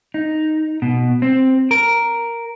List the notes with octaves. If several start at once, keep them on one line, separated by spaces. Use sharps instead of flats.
D#4
B2
C4
A#4